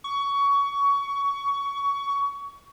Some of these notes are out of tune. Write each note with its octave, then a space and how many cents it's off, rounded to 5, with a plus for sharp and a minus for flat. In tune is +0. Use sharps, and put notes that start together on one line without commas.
C#6 +20